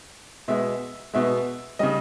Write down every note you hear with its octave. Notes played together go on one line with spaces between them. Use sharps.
B2 G#3 E5
B2 G#3 E5
C#3 G3 D#5